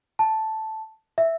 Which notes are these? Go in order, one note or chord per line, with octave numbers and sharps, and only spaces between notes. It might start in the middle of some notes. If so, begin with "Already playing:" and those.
A5
E5